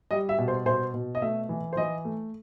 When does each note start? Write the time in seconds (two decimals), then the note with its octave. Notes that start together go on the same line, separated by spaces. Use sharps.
0.11 G3 D#5
0.29 E5
0.38 B2
0.48 C5
0.66 B2 C5
0.94 B2
1.15 D#5
1.22 A3 E5
1.49 E3
1.73 C5
1.77 E3 D#5
2.05 A3